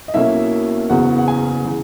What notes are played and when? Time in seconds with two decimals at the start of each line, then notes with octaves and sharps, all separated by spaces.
0.08 D#5
0.14 B1 B2 A#3 C#4 E4 E5
0.90 F#1 E2 C#3 E3 B3 F#4 F#5
1.19 F#5
1.28 G#4 G#5
1.65 C#3 E3